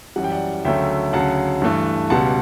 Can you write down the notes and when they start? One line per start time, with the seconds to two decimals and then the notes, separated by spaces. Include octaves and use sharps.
0.16 F#2 E3 G3 F#5
0.24 G5
0.32 D5 F#5
0.65 D2 C#3 F#3 A3 E5 G5
1.13 D2 C#3 F#3 F#5 A5
1.62 G2 E3 A3
2.10 C#2 B2 G3 F#5 A5